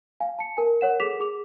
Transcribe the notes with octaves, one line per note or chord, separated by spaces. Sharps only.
F5 G#5
A5 C#7
A#4 G#5
A#4 C#5 F#5 E7
G#4 A4 D6 B6 E7 F7
G#4 D6 F7